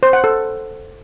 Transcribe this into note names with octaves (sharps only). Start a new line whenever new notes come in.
C5
F#5
A4